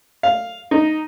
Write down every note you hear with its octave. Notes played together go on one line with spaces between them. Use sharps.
F5
D#4